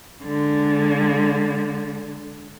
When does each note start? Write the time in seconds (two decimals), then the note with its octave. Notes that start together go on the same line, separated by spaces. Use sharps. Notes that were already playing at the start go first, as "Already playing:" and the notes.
0.24 D3 G#3